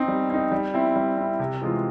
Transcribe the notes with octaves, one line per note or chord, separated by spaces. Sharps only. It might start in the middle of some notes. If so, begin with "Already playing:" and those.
Already playing: C4 D#4
G3
C4 D#4
G3
C4 E4
G3
C4 E4
C3
E3 G#3 C4 F4